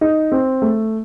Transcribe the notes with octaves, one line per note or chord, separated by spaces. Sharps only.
D#4
C4
A3